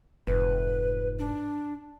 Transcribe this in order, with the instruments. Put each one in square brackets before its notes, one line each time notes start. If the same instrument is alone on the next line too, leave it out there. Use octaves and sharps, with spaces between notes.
[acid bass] F1 [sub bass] G#2 [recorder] B4
[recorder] D4